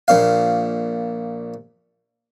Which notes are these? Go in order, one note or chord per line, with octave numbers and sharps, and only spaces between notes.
A#1 A#2 F5